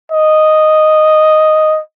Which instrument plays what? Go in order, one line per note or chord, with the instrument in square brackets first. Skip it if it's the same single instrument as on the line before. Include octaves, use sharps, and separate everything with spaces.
[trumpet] D#5